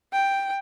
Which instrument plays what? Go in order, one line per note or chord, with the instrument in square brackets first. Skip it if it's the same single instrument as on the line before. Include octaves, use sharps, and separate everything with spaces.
[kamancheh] G5